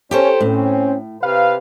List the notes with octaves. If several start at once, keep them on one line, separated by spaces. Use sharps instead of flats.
C#4 G4 A4 C5
A2 C4 C#4
C3 B4 F5